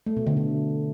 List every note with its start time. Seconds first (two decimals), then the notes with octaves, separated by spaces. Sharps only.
0.06 A3
0.17 B2
0.27 D3
0.37 D3